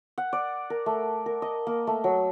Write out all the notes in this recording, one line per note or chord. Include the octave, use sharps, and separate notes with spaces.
F#5
D5
A#4
A3
A#4
D#5
A#3
A3
F#3